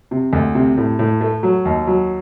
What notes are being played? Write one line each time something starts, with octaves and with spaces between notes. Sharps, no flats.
C3
D2
C3
A2
A2
A3
F#3
D#2
F#3